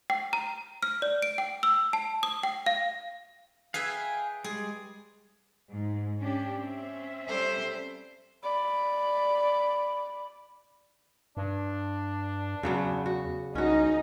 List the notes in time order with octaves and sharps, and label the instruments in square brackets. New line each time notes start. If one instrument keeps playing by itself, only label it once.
[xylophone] G5
A#5
F6
D5
D7
G5
E6
A5
D#6
G5
F5
[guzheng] G#4 B4 E5 [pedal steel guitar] F5 G5 G#5
[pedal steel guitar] G3 G#3 [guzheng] G#4
[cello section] G#2
C#4 D4 G4
C4 C#4 E5
[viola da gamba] G3 A4 C5
[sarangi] D5 [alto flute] B5
[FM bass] G2 [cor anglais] D4
[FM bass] E2 [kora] C#3 F#3 B3
[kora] F#4
[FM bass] C2 [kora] C#4 F#4 [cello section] D#4